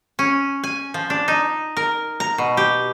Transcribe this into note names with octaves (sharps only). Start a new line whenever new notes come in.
C#4
G#5
F3
D4
D#4
A#4
A#5
B2
G4